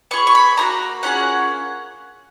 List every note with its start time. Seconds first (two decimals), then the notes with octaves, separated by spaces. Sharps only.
0.11 B3 F4 G#4 C#6
0.27 C#6
0.35 B5
0.57 A#3 D#4 F#4 A#5
1.03 A#3 C#4 F4 G#4 F#5